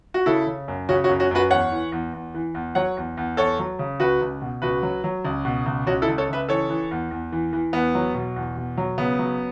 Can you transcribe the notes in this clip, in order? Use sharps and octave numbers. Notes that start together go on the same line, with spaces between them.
F#4
C#3 E4 A4
C#3
F#2
C#3 C#4 F#4
C#4 F#4
F#2
C#4 F#4
F#2 F#4 B4
E2 C#5 F#5
E3
E2
E2
E3
E2
F#3 C#5 F#5
E2
E2
E2 A4 C#5
F#3
C#3
C#2 F#4 B4
C#2
B2
C#2 F#4 B4
F#3
F#3
C#2
B2
C#2
C#2 C#4 F#4
E4 A4
C#2
A4 C#5
C#2 B4 E5
E3 A4 C#5
E3
E2
E2
E3
E3
E2 B3
F#3
B2
E2
B2
F#3
C#3 B3
F#3